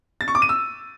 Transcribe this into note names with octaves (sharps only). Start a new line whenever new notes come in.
A6
C#6
D6
D#7
E6